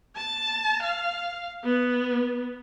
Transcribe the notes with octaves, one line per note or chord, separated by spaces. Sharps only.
A5
F5
B3